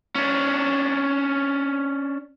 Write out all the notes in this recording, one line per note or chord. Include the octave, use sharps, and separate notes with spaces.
C#4 D4